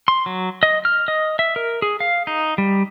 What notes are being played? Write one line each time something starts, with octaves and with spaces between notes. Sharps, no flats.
C6
F#3
D#5
F6
D#5
E5
A#4
G#4
F5
D#4
G3